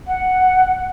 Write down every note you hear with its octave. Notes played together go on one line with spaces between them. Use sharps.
F#5